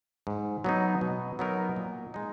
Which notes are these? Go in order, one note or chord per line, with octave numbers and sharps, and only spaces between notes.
G#2
F#3 B3 D#4
B2
F#3 B3 D#4 A#4
A#2
G#3 D#4